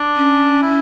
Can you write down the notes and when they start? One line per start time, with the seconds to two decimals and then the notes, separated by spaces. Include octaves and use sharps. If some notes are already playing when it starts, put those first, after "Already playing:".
Already playing: D4
0.16 C#4
0.62 E4